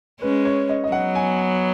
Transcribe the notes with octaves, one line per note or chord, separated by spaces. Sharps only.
G#3 C#4 B4
C#5
D#5
D#5
F#3 B3 F#5
G#5
G#5